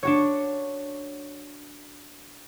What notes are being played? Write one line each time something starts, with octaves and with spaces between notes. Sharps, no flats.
D4 F#4 C#5